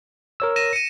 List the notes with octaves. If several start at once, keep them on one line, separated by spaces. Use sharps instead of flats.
A#4 C#5 E6
A#6 D#7 E7
C#7 D#7